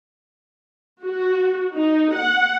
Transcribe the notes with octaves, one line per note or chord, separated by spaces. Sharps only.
F#4
D#4
F#5